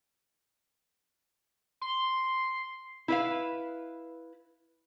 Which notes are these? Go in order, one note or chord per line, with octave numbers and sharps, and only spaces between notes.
C6
E4 B4 F5